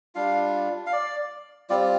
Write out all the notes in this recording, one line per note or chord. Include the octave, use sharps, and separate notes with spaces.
G3 D4 F4 F5
F5
D5
G3 C4 F4 D5